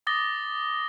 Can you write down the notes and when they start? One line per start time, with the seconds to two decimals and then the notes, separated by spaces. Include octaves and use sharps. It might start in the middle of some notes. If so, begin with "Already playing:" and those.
0.07 D6 D#6 A6 A#6 G7